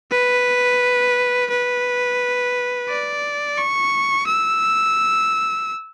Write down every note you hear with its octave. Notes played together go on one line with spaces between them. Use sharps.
B4
B4
D5
C#6
E6